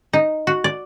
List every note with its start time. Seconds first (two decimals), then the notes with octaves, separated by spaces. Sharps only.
0.13 D#4
0.47 F#4
0.64 D5